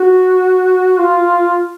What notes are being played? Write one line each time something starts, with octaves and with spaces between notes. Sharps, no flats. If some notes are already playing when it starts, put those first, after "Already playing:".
Already playing: F#4
F4